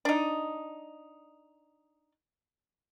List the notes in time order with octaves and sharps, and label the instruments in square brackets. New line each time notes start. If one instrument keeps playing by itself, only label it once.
[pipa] D4 D#4